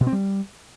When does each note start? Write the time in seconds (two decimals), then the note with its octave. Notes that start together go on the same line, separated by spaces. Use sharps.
0.01 B2
0.07 C4
0.12 G3